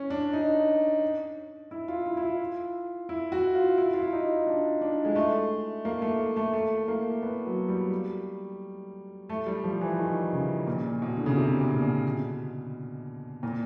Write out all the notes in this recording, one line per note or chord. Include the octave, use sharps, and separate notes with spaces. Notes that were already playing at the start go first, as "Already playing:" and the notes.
Already playing: C#4
D4
D#4
E4
F4
E4
E4
F4
E4
F#4
F4
E4
F4
E4
D#4
D4
D4
G#3
A3
A#3
A3
A3
A3
A#3
B3
F#3
G3
A3
G3
F3
E3
D#3
C#3
A#2
B2
D3
C#3
C3
A#2
B2
A#2